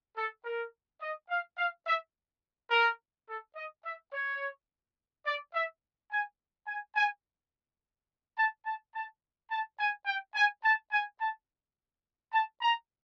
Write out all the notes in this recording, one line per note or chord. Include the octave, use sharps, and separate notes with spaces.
A4
A#4
D#5
F5
F5
E5
A#4
A4
D#5
E5
C#5
D5
E5
G#5
G#5
G#5
A5
A5
A5
A5
G#5
G5
G#5
A5
G#5
A5
A5
A#5